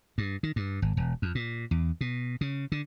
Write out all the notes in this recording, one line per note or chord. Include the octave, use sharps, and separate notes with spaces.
G2
D#3
G2
G#1
E1
F2
A#2
E2
B2
C#3
D3